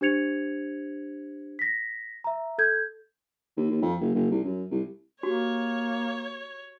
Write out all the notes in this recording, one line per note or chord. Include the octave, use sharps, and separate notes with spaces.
D4 G4 C5 G#6 C#7 F7
A#6 B6
E5 A#5
A4 G6 G#6
D#2
D#2
F2
F#1
F#1
C2
F#2
C2
A#3 F#4 G4 C#5